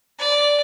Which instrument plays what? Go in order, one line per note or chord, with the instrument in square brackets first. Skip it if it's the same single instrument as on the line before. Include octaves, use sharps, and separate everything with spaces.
[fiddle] D5